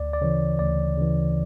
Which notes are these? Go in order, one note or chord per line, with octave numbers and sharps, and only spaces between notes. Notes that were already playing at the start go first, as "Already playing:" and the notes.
Already playing: D2 D5
D5
C#3 E3 C#5
D2 D5
C#3 E3